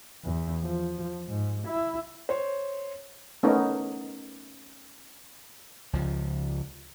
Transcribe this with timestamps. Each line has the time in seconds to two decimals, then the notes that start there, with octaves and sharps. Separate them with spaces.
0.25 E2
0.63 F3
1.29 G#2
1.68 E4
2.29 C5 C#5
3.43 A3 B3 C#4 D#4 A#4
5.93 C#2 F3